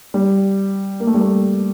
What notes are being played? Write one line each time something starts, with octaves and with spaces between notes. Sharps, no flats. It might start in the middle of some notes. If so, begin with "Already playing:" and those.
G3
A#3
A3
G3
A3